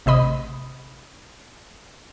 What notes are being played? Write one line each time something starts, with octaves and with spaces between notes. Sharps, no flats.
A1 C3 D#5 B5 D#6